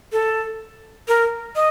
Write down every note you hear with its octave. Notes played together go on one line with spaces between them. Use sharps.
A4
A#4
D#5